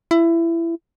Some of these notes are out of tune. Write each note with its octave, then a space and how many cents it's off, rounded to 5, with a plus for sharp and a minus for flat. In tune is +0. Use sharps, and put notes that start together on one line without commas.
E4 +20